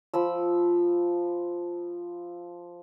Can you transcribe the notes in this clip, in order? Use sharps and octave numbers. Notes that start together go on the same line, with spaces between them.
F3 B5 E6